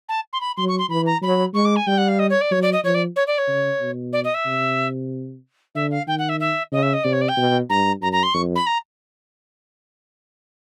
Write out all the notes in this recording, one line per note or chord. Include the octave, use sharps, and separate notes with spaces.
A5
C6
B5
F#3 C6
C#6
C6
E3 B5
A#5
F#3 B5
G#3 C#6
D6
G#5
G3 G5
F#5
F5
D#5
C#5
D5
F#3 C#5
D5
D#5
F3 C#5
D5
C#5
D5
C#5
C#3
B2
D5
D#5
E5
C3
D3 E5
F5
D#3 G5
F#5
E5
E5
C#3 D#5
E5
D#5
C3 D5
C#5
D5
G5
B2
G2 A#5
F#2 A#5
A#5
C6
F2 C#6
B5
A#5